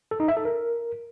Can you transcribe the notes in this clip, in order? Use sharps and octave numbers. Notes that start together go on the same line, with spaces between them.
A4
D#4
E5
A4
A#4